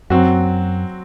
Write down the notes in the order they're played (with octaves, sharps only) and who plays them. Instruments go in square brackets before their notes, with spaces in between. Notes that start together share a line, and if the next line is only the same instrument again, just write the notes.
[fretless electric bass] F#2 [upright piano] F#3 C4 F#4